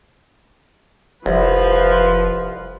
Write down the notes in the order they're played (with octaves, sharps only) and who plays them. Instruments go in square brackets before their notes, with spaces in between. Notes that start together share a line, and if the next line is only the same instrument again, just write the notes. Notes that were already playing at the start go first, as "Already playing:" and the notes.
[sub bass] F1 [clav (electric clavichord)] C2 [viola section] F3 B4